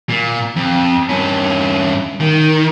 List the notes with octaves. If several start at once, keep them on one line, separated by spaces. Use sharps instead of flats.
A#2
F2
G2 C#4
D#3